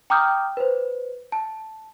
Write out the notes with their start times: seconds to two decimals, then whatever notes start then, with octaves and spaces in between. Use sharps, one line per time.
0.10 G5 A#5 D6 D#6 F6 G6
0.57 B4 C5
1.32 A5